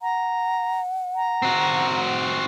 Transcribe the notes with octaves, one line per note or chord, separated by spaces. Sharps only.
F#5 A#5
A#5
C4 F#4